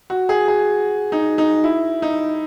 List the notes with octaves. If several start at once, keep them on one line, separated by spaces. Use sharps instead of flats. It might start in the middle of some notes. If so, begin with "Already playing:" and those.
F#4
G#4
G#4
D#4
D#4
E4
D#4